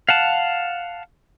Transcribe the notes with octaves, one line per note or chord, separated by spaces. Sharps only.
F5 F#5 A5